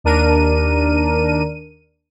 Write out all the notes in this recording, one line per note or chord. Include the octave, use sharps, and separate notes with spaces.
D#2 D4 A#4 D#7